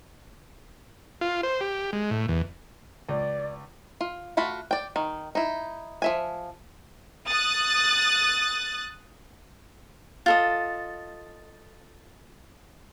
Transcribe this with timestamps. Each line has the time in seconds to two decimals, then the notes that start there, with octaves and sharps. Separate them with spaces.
1.21 F4
1.43 C5
1.61 G4
1.93 G#3
2.11 A2
2.28 E2
3.09 C#2 D5
4.01 F4
4.37 A3 F4 F#4 B5
4.71 D5 G5
4.96 D#3
5.35 D#4 E4
6.02 F3 E5 G#5
7.27 D#6 F#6 A6
10.26 F4 A4 D#5